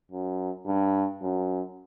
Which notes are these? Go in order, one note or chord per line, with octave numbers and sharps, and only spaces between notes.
F#2
G2
F#2